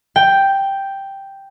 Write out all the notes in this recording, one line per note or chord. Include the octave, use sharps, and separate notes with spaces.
G5